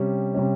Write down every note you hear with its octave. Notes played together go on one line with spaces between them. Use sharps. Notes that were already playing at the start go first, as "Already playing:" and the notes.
Already playing: C3 G3 C#4
C3 G3 C#4